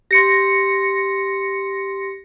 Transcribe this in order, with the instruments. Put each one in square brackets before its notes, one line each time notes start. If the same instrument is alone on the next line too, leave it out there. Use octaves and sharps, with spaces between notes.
[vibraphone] G4 C6 [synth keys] A#6 C#7